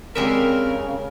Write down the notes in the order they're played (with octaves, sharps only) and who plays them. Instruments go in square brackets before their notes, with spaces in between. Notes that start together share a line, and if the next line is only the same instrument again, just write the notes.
[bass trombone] C#3 [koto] G3 G#3 E5 [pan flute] C4 [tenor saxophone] A#4